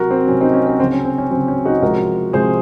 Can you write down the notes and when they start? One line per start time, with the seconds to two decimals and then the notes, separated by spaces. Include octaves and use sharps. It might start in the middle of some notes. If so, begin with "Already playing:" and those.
Already playing: C3 F#3 F#4 A#4
0.11 C4
0.27 F#3 C#4
0.32 C3
0.41 C4 D#4
0.54 C#4
0.67 C4
0.79 C#3 C4
0.83 F#3
0.93 C#4
1.05 C4
1.18 C#4
1.31 F#3 C4
1.35 C#3
1.48 C#4
1.65 D#4 F#4
1.82 C3 F3 G#3 F#4 A#4
2.33 C3 F3 G#3 G#4 C5